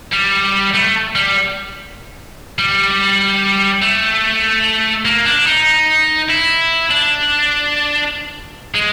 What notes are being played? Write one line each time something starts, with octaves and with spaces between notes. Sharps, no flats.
G3
A3
G3
G3
A3
A#3
D4
D#4
E4
D4
G#3